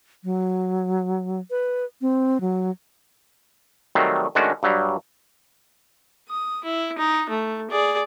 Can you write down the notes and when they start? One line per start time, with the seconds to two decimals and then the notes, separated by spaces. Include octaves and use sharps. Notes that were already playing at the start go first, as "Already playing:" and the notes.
0.24 F#3
1.51 B4
2.01 C4
2.41 F#3
3.95 D#3 F#3 G3 A3 C4
4.35 D#3 G#3 A3 C#4 D4 F#4
4.63 G2 F#3 G3
6.29 D#6
6.64 E4
6.98 D#4
7.30 A3
7.71 G#4 D5